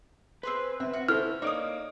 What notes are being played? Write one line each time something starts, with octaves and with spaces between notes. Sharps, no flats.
C4 G#4 B4 C5
C4 E4
F#4
C#4 E4 A4 C5 F6
A#3 D#4 C#5 D5 D#6